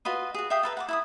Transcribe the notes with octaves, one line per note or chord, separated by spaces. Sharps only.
F4 F#4 B4 D#5
F#4 G#4
E5 F5 G5 D#6
A4 B4 A#5
F#5 B5 D6
E4 B5 D#6